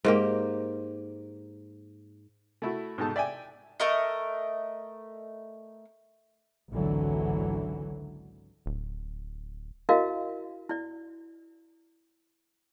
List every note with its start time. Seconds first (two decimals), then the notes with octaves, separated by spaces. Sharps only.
0.05 G#2 A#3 G4
2.62 A3 E4 F#4
2.98 G#2 B2 D#4 A4 A5
3.16 D5 E5 G5 G#5
3.80 A3 A#4 D#5
6.71 G#1 C#2 D3 E3 F#3
8.66 D1
9.89 E4 F#4 A#4 D#5 F5
10.69 E4 D5